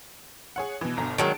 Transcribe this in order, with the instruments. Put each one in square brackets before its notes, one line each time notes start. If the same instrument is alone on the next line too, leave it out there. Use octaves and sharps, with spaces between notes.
[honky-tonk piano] G#4 C#5 F#5
B2 E3
G1 B2 A#5
[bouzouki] D#3 F#3 G#3 [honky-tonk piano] A5 D7